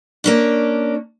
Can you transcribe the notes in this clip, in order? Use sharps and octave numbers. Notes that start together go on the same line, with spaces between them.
A#3 C#4 D4